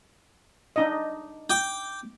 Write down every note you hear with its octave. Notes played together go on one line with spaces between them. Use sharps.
D4 D#4 D#5
G5 D6